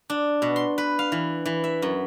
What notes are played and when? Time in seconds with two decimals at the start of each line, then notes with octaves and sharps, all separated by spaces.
0.10 D4
0.42 B2
0.56 C6
0.78 B4
0.99 F5
1.12 E3
1.46 E3
1.64 E5
1.82 F#2